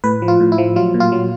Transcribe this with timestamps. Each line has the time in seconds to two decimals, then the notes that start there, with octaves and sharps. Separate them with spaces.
0.04 A2 B4
0.22 F3
0.28 F4
0.40 A2
0.52 E4
0.58 F3
0.76 F#3 F4
0.94 A#2
1.00 F4
1.12 F#3